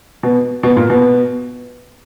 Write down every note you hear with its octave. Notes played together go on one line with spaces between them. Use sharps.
B2
B2
A#2
B2